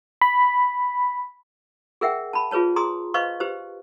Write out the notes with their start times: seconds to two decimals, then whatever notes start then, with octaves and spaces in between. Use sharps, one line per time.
0.22 B5
2.01 G#4 A#4 E5 F#5 G5
2.33 A5 B5
2.51 F4 G#4 B4 C#5 A5
2.76 G#4 A#5 C6 D#6
3.14 B4 C5 D#5 F5 C#6
3.40 G4 B4 C5